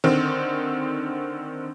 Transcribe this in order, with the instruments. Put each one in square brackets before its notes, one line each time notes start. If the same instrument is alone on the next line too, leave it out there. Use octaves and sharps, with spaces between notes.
[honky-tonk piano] D3 D#3 C4